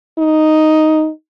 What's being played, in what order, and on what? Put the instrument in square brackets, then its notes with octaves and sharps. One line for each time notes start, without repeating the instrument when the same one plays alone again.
[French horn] D#4